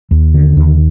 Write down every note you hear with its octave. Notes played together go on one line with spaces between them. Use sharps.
D#2
D3
D#2